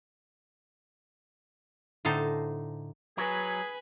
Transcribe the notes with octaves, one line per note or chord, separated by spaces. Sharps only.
A2 D3 D#4 C5 A5
F#3 G#4 B4 G#5 B5